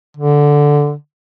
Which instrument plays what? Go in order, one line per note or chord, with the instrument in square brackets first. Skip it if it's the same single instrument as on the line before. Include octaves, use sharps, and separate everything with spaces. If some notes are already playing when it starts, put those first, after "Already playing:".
[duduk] D3